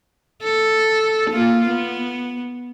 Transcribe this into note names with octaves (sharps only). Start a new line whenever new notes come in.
A4
A#3 F4
B3